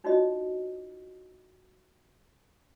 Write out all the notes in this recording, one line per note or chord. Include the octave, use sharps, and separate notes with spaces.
D4 D#4 F4 F#4 C#5 D#5